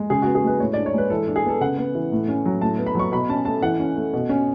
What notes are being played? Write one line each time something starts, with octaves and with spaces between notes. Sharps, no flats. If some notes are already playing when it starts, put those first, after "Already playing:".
Already playing: G#3
C#3 G#4
F#4
B3
G#4
G#3 B4
A2 C#5
D4 D5
C#5
G#3 B4
E3 A4
D4
G#4
B3 A4
C#3 F#5
B3
E3
A2
C#4
F#3
A2 A5
B3
B5
F#3 C#6
B2 B5
C#4 A5
A3 A5
E3 F#5
C#4
A3
B2
C#4